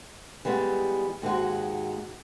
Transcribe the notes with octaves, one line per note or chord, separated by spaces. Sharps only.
E3 G3 G#3 B3
D#2 G#2 G#3 F#4